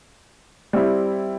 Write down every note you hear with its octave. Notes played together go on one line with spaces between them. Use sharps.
G3 C4 E4